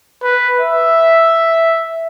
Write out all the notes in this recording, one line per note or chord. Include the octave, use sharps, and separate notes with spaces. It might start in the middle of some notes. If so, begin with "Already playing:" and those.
B4
E5